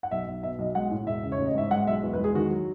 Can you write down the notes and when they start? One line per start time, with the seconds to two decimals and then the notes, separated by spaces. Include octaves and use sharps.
0.03 F#5
0.11 B1 E5
0.28 B1
0.43 B2 E5
0.59 B1 D#5
0.75 G#3 F#5
0.91 A2
1.07 E1 E5
1.23 C#3
1.32 C#5
1.39 A1
1.46 D#5
1.55 G#2 E5
1.71 G#3 F#5
1.86 B1 E5
2.03 E2
2.13 B4
2.18 G#3
2.24 G#4
2.34 D#3 F#4
2.50 F#3